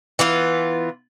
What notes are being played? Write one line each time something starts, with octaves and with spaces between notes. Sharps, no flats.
E3 B3 F4